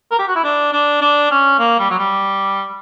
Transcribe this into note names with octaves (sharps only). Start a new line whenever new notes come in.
A#4
G4
F#4
E4
D4
D4
D4
C#4
A#3
G3
F#3
G3